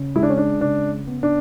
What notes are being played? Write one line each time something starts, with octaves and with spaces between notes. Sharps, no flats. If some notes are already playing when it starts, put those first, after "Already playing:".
Already playing: C#3
G#3 E4
D4
C#4
D4
C#3 D4
B3
D4